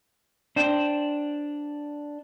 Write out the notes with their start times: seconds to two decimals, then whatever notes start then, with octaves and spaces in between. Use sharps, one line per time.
0.56 D4 C5 G5